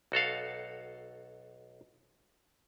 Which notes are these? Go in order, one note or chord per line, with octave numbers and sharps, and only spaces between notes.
B1 F#4 A4 F5